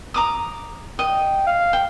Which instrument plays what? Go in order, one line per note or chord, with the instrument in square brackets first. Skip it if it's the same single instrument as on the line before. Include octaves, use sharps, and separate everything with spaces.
[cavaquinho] A#5 D6 D#6
[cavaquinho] D#5 [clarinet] G5
[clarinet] F5
[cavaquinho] G5